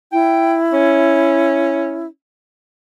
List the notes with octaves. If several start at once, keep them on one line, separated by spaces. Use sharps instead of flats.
E4 G5
C#4